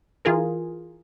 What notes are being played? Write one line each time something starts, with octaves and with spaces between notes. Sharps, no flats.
E3 F4 G#4 A#4